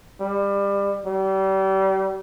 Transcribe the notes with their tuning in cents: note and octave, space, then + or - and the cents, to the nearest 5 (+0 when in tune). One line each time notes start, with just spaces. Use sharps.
G3 +30
G3 -35